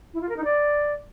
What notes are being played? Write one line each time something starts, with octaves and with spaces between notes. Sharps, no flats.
E4
F4
A#4
D#4
D5